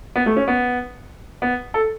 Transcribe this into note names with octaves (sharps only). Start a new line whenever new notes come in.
B3
A3
C#4
B3
B3
A4